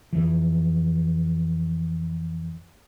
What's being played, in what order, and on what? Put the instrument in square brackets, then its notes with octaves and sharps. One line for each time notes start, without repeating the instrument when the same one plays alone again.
[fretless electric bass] F2 E3